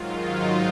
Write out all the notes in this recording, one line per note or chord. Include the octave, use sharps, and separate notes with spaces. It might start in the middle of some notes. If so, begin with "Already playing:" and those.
Already playing: G#2 D#3 F#3 F4
D#4